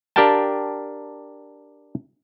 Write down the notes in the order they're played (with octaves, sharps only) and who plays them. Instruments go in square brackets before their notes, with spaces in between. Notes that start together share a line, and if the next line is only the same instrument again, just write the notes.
[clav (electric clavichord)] D4 G4 A#4 F5 G5 A5